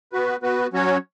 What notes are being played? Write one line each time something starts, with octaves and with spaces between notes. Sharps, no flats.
B3 F#4 B4
B3 F#4 B4
F#3 C#4 F#4 C#5